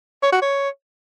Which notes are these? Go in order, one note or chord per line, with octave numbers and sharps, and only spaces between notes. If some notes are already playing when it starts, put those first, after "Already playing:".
C#5
F#4
C#5